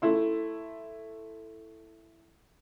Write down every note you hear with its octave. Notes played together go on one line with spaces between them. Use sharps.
A3 E4 C6